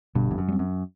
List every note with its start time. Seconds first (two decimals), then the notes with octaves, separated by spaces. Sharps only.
0.15 G1 G2 B2
0.31 E2
0.38 F#2
0.48 G3 C4
0.59 F#2